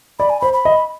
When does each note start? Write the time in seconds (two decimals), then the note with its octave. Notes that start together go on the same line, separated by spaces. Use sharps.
0.19 D5 B5
0.30 G#5
0.41 C5 B5
0.53 B5
0.65 D#5